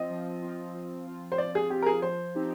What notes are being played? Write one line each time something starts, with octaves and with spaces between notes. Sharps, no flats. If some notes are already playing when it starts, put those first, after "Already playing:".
Already playing: F3 C4 F4 D#5
F3
C4 F4
F3
C4 F4
C5
F3 D5
G#4
C4 F4 G4
A#4
G#4
F3 C5
C4 D#4 G4